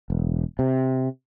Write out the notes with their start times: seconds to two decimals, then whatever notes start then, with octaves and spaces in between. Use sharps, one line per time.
0.10 E1
0.59 C3